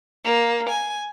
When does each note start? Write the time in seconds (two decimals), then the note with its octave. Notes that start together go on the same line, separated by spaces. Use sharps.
0.24 A#3
0.70 G#5